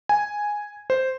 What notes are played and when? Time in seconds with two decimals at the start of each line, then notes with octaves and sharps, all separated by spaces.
0.09 G#5
0.90 C5